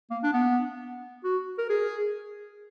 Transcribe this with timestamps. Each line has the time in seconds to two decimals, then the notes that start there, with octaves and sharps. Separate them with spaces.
0.11 A#3
0.23 D4
0.33 B3
1.24 F#4
1.59 A#4
1.70 G#4